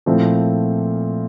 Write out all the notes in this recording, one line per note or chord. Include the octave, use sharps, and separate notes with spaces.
A#2 F3 A3 C4 E4